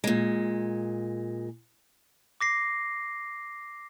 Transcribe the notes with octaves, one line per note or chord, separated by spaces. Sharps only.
A#2 G#3
D6 A#6 C7